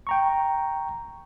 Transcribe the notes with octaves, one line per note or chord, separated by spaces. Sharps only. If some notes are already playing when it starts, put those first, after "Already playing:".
G5 A#5 C#6